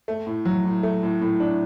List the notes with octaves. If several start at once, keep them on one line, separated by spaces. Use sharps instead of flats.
A3
A2
F#3
A2
A3
A2
A2
D4